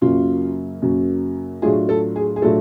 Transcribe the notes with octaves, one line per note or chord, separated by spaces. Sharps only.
F#2 C#3 F#3 A#3 F4
F#2 C#3 F#3 A#3
A2 F#3 A3 D4 F4 G#4
A4
G#4
G#4
A2 F#3 A3 D4 F4 A4